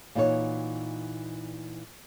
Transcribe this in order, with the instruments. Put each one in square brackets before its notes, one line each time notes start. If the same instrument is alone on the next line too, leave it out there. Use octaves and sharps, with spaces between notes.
[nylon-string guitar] A#2 E3 D#4 F#4 B4 C#5